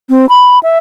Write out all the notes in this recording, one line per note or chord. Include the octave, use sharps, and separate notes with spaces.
C4
B5
E5